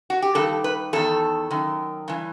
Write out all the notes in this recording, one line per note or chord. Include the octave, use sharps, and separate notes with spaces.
F#4
G4
G2 D#3 A4
B4
E2 D#3 A4
F#2 D#3
G2 E3